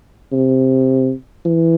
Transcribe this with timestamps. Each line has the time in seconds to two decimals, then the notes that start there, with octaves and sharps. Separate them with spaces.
0.32 C3
1.45 E3